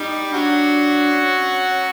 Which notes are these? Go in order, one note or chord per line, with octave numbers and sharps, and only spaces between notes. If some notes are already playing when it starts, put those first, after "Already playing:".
Already playing: G3 D#4 G4
F#3 D4 F#4
C#4